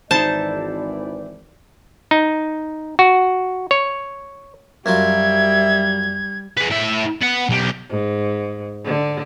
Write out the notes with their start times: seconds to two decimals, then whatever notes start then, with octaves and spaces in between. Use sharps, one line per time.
0.11 G#1 E3 D#4 E4 C5 D5 A5
2.11 D#4
2.99 F#4
3.71 C#5
4.86 F#2 F#3 G3 F4 E5 G#6
6.57 G#4 B4
6.70 A2 E5
7.21 B3 F#5
7.49 B1 G4
7.89 G#2
8.84 D3